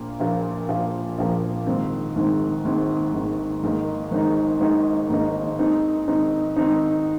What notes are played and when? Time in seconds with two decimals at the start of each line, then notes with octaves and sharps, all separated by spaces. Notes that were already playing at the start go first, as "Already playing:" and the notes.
Already playing: A#1 A#2 F3 A#3
0.20 A#1 A#2 F3 A#3
0.69 A#1 A#2 F3 A#3
1.18 A#1 A#2 F3 A#3
1.67 G#1 G#2 D#3 C4
2.15 G#1 G#2 D#3 C4
2.65 G#1 G#2 D#3 C4
3.14 G#1 G#2 D#3 C4
3.63 G#1 G#2 D#3 A#3 D#4
4.11 G#1 G#2 D#3 A#3 D#4
4.60 G#1 G#2 D#3 A#3 D#4
5.10 G#1 G#2 D#3 A#3 D#4
5.58 G#2 D#3 C4 D#4
6.08 G#2 D#3 C4 D#4
6.56 G#2 D#3 C4 D#4